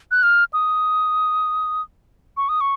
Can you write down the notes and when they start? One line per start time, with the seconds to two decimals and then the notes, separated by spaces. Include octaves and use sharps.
0.11 F#6
0.23 F6
0.53 D#6
2.37 C#6
2.49 D#6
2.61 C#6